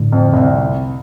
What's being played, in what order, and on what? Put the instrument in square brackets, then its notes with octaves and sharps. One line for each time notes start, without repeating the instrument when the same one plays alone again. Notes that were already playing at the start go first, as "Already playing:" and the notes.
Already playing: [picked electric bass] A2 D3
[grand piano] F2
C2